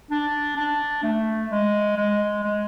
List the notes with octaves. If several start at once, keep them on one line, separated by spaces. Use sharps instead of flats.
D4
D4
A3
G#3
G#3
G#3